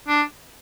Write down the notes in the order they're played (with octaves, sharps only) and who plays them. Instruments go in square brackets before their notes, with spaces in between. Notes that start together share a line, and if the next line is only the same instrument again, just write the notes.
[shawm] D4